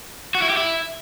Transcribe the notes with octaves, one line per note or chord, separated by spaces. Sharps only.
F#4
E4
G4
E4